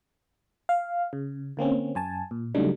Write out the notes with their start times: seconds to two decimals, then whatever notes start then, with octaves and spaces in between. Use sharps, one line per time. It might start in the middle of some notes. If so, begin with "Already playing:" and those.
0.69 F5
1.13 C#3
1.57 D3 A#3 C4 C#4
1.95 F#2 G#5 A5
2.31 A#2
2.55 C#3 F#3 G3 A3 D4 D#4